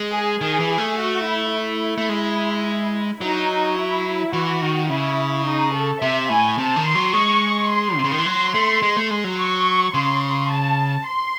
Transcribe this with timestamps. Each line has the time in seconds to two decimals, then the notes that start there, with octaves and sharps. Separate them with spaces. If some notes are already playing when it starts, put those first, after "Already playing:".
Already playing: G#3
0.13 G#4
0.41 D#3 G#4
0.60 E3
0.69 G#4
0.78 A3
0.97 F#4
1.25 E4
1.53 E4
1.98 A3
2.09 G#3
3.21 F#3 D#4
3.77 E4
4.33 E3 F#4
4.62 D#3
4.89 C#3 E4
5.46 D#4
5.74 A4
6.02 C3 E5
6.29 A2 G#5
6.58 C3 A5
6.76 D#3
6.87 C6
6.95 F#3
7.13 G#3 C#6
7.70 C6
7.97 C3
8.04 C#3
8.12 D#3
8.18 E3
8.26 F#3
8.54 A3
8.82 G#3
8.97 A3
9.10 G#3
9.24 F#3
9.39 C#6
9.94 C#3 C6
10.50 A5
11.06 C6